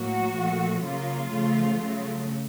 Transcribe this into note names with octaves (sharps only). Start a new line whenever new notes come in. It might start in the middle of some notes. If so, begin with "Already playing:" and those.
Already playing: A2 F#3 A#3 F#4
A#2 F3 A3
C#3 F#3 A#3 F4
C#3 F3 A3
C#3 F#3 A3